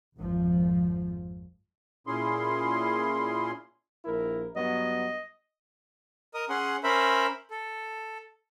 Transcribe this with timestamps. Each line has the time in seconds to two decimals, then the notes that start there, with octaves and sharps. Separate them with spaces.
0.17 G#1 F2 G#2 F3
2.07 A#2 C#4 E4 G#4 C6
4.05 A#1 E4 A#4
4.56 G2 F#3 B3 D#5
6.34 A#4 D#5 D#6
6.49 C#4 G#4 F#5 C6
6.84 C#4 A#4 C5 E5 B5
7.51 A4